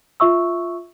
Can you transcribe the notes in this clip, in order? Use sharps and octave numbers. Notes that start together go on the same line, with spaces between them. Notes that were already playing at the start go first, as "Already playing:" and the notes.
F4 E5 C#6 E6